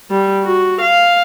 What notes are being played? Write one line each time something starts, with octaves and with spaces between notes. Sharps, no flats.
G3
F#4
F5